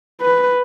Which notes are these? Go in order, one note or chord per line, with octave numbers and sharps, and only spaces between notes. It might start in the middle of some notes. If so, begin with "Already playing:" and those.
B4